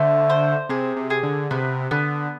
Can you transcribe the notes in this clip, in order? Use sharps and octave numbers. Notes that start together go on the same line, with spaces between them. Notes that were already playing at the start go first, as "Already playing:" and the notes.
Already playing: D3 A3 C5
C5
C3 G#4
C3
G#4
D3
C3 B3
D3 B3